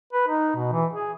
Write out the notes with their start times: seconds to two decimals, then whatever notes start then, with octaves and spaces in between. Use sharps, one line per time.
0.13 B4
0.28 D#4
0.55 B2
0.72 E3
0.93 G#4